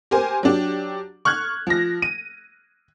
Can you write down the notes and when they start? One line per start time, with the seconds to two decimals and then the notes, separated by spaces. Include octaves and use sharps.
0.11 G4 A#4 C5 G#5
0.43 F#3 D4 G4
1.25 C#6 F6 F#6 G#6
1.67 F3 A#6
2.02 D#7